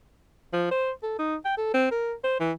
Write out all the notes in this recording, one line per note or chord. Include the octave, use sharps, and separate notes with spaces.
F3
C5
A4
D#4
G5
A4
C4
A#4
C5
E3